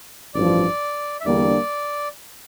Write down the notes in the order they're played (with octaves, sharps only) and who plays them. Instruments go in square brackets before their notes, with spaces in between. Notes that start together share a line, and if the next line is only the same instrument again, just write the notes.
[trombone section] A1 G2 F3 [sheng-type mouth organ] D5
[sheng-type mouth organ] E5
[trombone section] E2 D3 G3 A#3 D4 [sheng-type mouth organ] D5